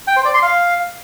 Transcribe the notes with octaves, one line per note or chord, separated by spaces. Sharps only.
G5
C5
D5
C6
F5